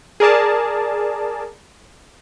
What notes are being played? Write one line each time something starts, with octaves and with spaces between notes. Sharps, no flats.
G#4 A#4 D5 A5